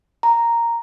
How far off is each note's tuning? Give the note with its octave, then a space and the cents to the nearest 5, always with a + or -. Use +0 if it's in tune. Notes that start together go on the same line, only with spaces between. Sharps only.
A#5 -5